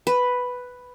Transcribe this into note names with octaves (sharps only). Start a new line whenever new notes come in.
B4